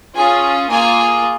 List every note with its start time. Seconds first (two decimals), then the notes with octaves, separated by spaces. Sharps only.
0.15 C#4 F4 G#4 G#5
0.69 A#3 F4 G#4 G#5